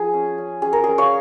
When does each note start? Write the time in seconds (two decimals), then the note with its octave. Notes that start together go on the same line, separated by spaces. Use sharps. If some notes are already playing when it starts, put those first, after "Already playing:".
Already playing: F3 G#4
0.13 C#4
0.38 C#4
0.62 C#4 G#4
0.73 A#4
0.84 C#4 G#4
0.98 C#5 F5